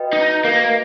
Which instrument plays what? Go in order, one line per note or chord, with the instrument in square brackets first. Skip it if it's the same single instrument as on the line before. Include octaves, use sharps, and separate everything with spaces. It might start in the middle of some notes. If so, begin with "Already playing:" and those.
Already playing: [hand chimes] F#4 B4 D#5 G5
[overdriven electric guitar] D#4
A#3